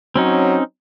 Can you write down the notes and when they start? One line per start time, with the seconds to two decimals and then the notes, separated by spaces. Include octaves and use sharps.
0.16 F#3 C4 C#4 D#4